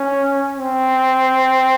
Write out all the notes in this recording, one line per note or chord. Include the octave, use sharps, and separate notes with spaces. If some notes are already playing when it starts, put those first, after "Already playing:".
Already playing: C#4
C4